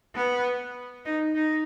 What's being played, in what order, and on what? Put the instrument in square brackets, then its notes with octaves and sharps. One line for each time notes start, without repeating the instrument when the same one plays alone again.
[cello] B3
D#4
D#4